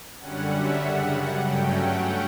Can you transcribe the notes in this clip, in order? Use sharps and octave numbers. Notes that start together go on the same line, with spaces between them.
F#2 D3 G3 C#4 F#5
E5
F#2 C#3 G3 F#5
G2 F#3 A3 C#4 G5
F#5